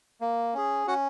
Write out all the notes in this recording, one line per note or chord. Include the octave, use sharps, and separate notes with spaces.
A#3
C#4 G#4
C#4 F#4 F#5